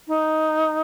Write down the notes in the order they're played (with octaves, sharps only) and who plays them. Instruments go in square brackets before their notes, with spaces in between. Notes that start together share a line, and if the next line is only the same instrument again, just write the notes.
[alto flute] D#4